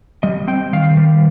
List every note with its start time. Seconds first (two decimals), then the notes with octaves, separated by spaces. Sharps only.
0.23 G3 D#5
0.48 C4 G5
0.73 D#3 F5
0.97 G3